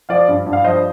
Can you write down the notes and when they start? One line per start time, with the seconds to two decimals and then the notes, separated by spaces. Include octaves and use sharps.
0.09 F3 D5 F5
0.28 G2
0.46 G2
0.53 F5
0.64 F3 C5 D#5